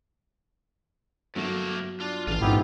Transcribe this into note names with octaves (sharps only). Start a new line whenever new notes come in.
G1 F#2 F#3 A3 A#3 E7
D4 F4
A1 A3 F4 F5
D#1 F2 G#2 B3 E4 G4